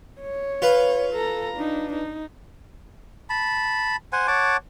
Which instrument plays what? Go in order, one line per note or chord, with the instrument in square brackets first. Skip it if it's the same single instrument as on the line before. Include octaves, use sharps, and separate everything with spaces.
[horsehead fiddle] C#5
[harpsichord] F4 B4
[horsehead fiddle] A4 A#5
D4 D#4
D#4
[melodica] A5 B5
C5 F#5 G#5
C#5 F#5 A5 D6